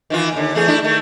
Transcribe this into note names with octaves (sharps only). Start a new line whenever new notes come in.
D#3 E3 F4
D#2 D3
E2 A3 G#4
A3 D4 E4
D#3 A3